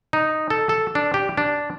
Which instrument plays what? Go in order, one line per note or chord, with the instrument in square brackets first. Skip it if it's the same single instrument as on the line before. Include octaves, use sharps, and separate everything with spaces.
[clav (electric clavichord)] D#4
A4
A4
D4
G4
D4